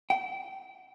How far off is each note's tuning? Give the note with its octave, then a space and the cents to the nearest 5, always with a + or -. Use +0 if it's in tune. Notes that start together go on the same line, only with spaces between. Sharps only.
G5 -30